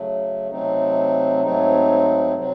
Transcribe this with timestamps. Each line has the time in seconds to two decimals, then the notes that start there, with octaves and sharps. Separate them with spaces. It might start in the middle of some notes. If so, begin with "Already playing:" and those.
Already playing: C#3 F#3 A3
0.51 C3 F#3 A3 C4 D#4
1.42 G#2 F#3 A3 C4 D#4
2.34 C3 F#3 C4